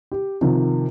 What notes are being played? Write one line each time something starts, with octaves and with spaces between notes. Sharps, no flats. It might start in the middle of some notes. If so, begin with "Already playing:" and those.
G4
C3 D#3 F3